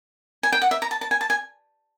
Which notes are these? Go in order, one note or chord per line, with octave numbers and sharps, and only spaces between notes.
G#5
G5
F#5
E5
A#5
A5
A5
G#5
A5
G#5